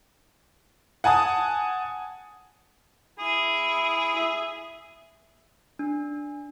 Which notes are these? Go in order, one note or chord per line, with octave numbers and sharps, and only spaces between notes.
F#5 G#5 A5 D#6
E4 G#4
E5
D4